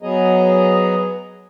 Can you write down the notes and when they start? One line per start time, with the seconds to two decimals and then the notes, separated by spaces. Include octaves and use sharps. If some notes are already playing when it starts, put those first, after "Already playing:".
0.03 F#3 B3 G#4 D#5 A#5